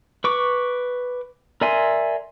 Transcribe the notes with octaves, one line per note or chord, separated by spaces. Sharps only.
B4 C#6 D6
A#4 D5 E5 G#5 C6